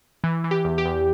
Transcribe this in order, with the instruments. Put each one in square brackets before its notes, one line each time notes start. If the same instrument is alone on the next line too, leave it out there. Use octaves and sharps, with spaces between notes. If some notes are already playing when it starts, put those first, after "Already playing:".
[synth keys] E3
E3
G4
E2
G4
E2